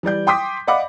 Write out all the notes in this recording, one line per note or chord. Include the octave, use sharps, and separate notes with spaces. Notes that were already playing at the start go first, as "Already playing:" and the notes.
E3 G3 D5 G6
G5 C6 D6 D#6 B6
D5 D#5 F5 F#5 B5 D6